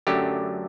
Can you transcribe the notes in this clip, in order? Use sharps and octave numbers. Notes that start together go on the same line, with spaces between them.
F#2 D3 F#3 A3 G4